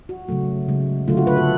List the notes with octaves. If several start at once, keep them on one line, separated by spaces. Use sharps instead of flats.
F#4
C#3 F#3 A3
C#3 G#3
D3 F#3 A3 F4
F#4
B4
A4